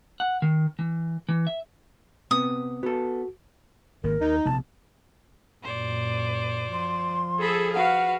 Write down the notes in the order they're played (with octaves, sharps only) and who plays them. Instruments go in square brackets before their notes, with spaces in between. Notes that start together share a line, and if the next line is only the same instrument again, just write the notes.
[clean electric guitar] F#5
D#3
E3
E3
E5
[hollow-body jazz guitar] C3 B3 [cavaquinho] D#6
[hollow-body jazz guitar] B3 A4 [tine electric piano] F#4
[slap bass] G#1 D#3 A#3 [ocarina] A#4
[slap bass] D#2 [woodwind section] D#4
[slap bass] A#1 C3 B3 [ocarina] A5
[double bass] F#2 A#2 [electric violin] C5 D5
[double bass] F3 [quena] C6
[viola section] G#4 A4 [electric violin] B5
[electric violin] F#4 B4 [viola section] F5 [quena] F#5